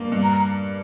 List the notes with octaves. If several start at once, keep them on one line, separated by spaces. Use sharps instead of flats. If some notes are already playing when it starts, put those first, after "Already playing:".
Already playing: G2 A#3
G2
A#5